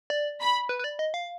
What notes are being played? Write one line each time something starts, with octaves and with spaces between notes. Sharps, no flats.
D5
B5
B4
B4
D5
D#5
F5